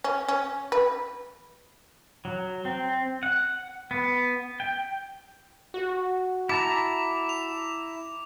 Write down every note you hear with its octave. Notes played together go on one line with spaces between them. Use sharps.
C#4
C#4
B4
F#3
C4
F#5
B3
G5
F#4
E4 A5 A#5 D6
F7